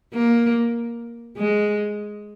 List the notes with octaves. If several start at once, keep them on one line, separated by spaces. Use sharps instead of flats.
A#3
G#3